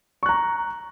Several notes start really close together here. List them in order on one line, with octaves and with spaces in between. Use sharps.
C#6 F#6 A#5